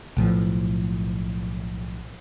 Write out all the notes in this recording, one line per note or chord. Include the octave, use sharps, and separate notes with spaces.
B1 A2 F3